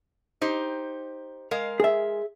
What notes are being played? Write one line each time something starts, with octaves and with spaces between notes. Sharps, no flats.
D#4 G4 C5
G#3 A#4 F5
G#4 E5